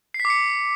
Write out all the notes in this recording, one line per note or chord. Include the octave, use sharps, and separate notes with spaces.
C7
B6
D6
C#7